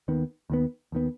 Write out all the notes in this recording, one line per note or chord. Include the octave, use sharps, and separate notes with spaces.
D#2 D#3 B3
D#2 D#3 B3
D#2 D#3 B3